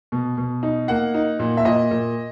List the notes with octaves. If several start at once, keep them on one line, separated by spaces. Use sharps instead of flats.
B2
B2
D#4
A#3 F#5
D#4
A#2
E5
A#2 D#5
A#2